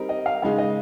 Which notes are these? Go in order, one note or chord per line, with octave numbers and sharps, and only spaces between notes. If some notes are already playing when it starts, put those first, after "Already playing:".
Already playing: G3 C4 D#4 A#4
D#5
F5
C#3 G#3 D#4 F5
D#5